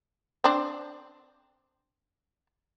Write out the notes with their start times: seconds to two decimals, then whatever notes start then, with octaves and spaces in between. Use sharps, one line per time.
0.44 C4 D4